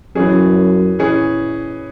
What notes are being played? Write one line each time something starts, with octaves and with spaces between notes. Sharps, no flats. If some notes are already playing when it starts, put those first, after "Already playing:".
F#2 E3 C#4 G#4
E3 C#4 G#4